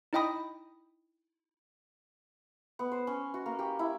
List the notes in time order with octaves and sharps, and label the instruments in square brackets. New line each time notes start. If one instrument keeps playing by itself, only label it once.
[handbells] D#4 E4 D#5 G5 B5 D#6
[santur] B3
C5
C#4
F#4
A#3
G4
E4